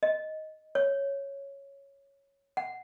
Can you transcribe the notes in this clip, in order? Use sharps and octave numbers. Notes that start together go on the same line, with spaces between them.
D#5
C#5
F#5